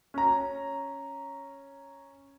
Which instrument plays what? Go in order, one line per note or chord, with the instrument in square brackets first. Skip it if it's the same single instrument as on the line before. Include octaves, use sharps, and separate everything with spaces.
[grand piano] C#4 A#5